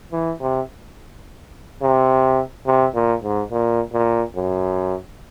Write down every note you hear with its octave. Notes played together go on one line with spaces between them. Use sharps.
E3
C3
C3
C3
A#2
G#2
A#2
A#2
F#2